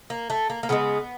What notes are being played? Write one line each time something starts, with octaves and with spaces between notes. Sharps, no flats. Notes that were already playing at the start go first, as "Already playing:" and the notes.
A#3
A3
A#3
A#3
C#3 E3 G#3 B3